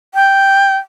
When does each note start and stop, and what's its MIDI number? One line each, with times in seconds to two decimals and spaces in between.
0.14 0.77 79